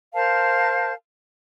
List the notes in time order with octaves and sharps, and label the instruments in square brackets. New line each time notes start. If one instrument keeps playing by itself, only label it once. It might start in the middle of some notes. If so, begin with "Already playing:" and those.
[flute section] A#4 C5 F5 A5